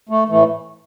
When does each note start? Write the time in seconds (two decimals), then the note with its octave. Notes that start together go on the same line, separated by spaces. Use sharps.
0.09 A3
0.29 A2 E3 A3